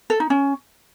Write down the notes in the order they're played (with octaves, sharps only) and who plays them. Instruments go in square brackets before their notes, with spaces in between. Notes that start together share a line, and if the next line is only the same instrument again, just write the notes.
[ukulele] A4
D#4
C#4